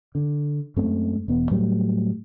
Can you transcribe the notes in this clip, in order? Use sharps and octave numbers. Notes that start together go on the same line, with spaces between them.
D3
F#2 G#3 A3 C4
E1 B3
A2 F#3 G3 A3